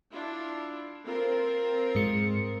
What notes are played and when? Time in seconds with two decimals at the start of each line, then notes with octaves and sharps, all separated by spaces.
0.11 D4 E4 F4
1.06 C4 F4 A#4
1.95 G#2 G#3 C#7